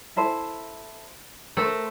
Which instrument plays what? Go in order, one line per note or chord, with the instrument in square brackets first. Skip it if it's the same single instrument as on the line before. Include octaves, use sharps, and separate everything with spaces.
[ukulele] E4 A4 C5
[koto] A3 [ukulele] A#4 C5